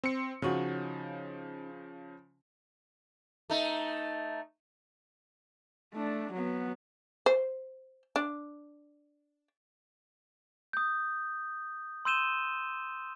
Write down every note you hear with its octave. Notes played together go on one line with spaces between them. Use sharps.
C4 C6 C#7
C#3 F3 C#4 D#4 F#4
A3 D#4
A3 D4
F#3 B3
C5
D4
D#6 G6
C6 E6 G6 D#7 E7 G7